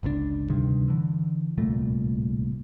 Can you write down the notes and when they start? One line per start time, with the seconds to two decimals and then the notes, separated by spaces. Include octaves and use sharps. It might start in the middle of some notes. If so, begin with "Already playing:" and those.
0.03 G1 C#2 C#3 D4
0.49 D2 G2 C3 D#3
0.88 D3 E3
1.58 D1 C2 A#2 A3